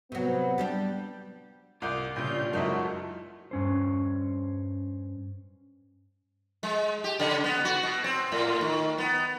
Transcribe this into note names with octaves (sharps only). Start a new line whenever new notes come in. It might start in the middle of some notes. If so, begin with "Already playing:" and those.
C3 F#3 B3
G3 D4 G4
C2 F4 D6 G6
A#1 C#3 G3 G6
F#1 F#3 G#3 D#4 E4 F#4 A4
G2 C#4 C5
G#3
G4
C#3
B3
F#4
B2
C4
A2
D#3
B3